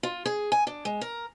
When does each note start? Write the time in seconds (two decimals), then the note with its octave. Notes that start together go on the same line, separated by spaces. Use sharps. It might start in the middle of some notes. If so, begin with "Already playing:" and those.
0.03 F4
0.26 G#4
0.52 G#5
0.67 D4
0.85 G#3
1.01 A#4